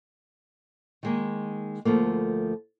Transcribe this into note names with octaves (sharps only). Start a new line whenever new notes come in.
D#3 G#3 A#3
D2 F3 A3 A#3